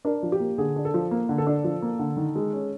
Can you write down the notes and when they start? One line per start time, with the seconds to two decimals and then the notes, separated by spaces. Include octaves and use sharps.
0.05 D4 A#4
0.23 F3
0.32 G4
0.40 A#3
0.58 D3 G#4
0.76 D4
0.85 A4
0.94 F3
1.11 A#3
1.29 D3
1.38 A4
1.47 D4
1.64 F3
1.82 A#3
1.99 D3
2.17 D#3
2.36 G#3
2.53 C#4